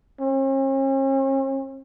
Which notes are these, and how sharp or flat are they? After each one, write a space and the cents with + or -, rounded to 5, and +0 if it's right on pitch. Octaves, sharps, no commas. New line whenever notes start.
C#4 -45